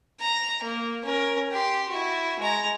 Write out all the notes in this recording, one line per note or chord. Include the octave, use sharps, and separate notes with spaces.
A#5
A#3
C#4 A#4
G4 C6
E4 F#4
G#3 A#5